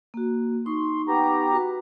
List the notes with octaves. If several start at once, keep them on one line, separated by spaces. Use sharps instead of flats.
A#3 F#4
D#4 C6 C#6
B3 G4 A#5
F#4 B4